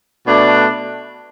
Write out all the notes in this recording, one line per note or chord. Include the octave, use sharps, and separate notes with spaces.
B2 A3 D4